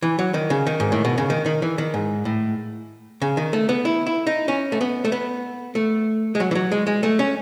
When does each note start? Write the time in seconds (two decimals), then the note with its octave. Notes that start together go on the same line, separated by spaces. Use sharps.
0.02 E3
0.19 F#3
0.34 D#3
0.50 C#3
0.67 D#3
0.80 G#2
0.92 A2
1.05 B2
1.18 C#3
1.30 D#3
1.46 D#3
1.62 E3
1.78 D#3
1.94 G#2
2.25 A2
3.22 C#3
3.37 D#3
3.53 A3
3.69 B3
3.85 E4
4.07 E4
4.27 D#4
4.48 C#4
4.72 A3
4.81 B3
5.05 A3
5.12 B3
5.75 A3
6.35 G#3
6.40 F#3
6.51 E3
6.55 F#3
6.72 G#3
6.87 G#3
7.03 A3
7.19 C#4